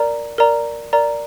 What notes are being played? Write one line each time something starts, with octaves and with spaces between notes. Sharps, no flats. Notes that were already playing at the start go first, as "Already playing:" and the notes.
Already playing: A#4 D5 A#5
A#4 D5 A#5
A#4 D5 A#5